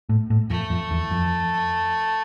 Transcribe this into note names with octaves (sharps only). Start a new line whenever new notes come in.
A2
A2
F2 A3
F2
E2
F2